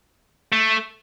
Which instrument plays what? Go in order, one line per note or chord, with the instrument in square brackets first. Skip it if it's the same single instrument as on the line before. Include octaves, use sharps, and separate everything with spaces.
[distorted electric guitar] A3